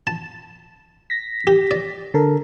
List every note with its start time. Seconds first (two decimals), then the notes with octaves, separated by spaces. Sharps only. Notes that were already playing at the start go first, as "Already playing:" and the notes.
0.07 A5
1.10 A#6 B6
1.47 G4
1.71 D5
2.14 D3 A4 A#4